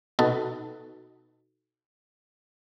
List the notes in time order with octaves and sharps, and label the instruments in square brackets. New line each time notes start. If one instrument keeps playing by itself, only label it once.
[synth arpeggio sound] B2 D#4 F#4 A4 B4